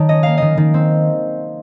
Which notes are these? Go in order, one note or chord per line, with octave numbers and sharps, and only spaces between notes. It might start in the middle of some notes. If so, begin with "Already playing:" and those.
Already playing: D#3 F#3 A5
C#4 D#5
A#3 F5
D#3 D#5
D#3
C4